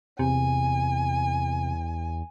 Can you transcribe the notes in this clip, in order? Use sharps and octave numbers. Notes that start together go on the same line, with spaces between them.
E2 C3 G#5